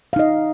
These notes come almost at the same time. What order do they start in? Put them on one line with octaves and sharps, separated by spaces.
F5 D#4 D#5